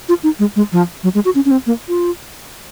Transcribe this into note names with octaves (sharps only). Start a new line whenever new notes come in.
F4
D#4
G#3
G#3
F3
F#3
G#3
F#4
C#4
C#4
C4
A#3
F4